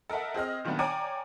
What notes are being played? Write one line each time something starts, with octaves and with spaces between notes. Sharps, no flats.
A4 A#4 D#5 E5 F#5
C4 G#4 D#5 F6
A#2 D#3 F#3 A3 B3 D4
C#5 D5 G5 G#5 A#5 D6